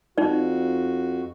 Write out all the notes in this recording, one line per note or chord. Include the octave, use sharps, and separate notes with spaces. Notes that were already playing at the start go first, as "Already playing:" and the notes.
F2 D#4 F#4 D5